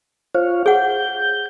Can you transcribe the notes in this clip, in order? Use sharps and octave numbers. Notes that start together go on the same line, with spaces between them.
F4 C5 C#5 F5
G#4 F#5 G6